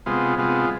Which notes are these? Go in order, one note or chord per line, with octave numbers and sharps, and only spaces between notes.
C3 G#3 B3 F4
C3 G#3 B3 F4